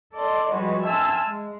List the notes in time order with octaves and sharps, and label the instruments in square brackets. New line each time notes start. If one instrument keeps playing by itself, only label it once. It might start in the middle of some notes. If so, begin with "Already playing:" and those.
[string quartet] A4 D5 D#5 C6
F3 G3 G#3 F#4 B4 C#5
E5 G#5 A5 C6 E6 F6
G#3